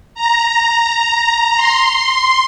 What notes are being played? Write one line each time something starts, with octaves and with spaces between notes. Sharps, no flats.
A#5
C6